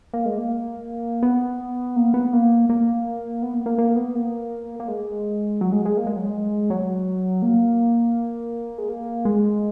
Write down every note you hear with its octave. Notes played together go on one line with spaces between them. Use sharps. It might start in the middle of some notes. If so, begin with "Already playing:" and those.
A#3
G#3
A#3
B3
A#3
B3
A#3
A#3
B3
A#3
A#3
A#3
B3
A#3
A#3
G#3
F#3
G#3
G#3
A#3
G#3
F#3
G#3
F#3
A#3
G#3
A#3
G#3